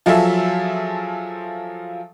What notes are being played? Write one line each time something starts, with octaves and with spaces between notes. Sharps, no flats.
F3 F#3 F4 G#4 A4 E5